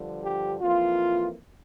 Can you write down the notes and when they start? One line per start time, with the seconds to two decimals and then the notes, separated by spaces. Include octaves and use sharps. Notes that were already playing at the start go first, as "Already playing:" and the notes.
Already playing: G2 D3 F3
0.22 G4
0.60 F2 E3 A#3 F4